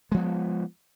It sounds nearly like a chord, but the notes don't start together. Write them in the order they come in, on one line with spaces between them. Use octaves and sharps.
G#3 F3 B3